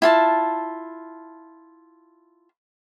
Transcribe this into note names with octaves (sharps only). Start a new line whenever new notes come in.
E4 F4 A5